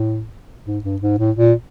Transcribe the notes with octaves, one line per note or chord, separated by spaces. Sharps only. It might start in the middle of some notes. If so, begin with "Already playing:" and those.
Already playing: A2
G#2
G2
G#2
A2
A#2